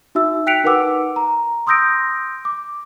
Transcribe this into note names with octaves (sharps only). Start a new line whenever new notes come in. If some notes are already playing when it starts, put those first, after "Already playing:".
D#4 F#4 E5 E6
G5 F#6 B6 C#7 D7 F7
D#4 A#4 B4 F#5 D6 E6
A#5
C6 D#6 E6 G6 A#6 D7
D6